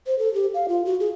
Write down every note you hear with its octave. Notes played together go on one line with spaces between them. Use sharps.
C5
A4
G4
F5
F4
F#4
G#4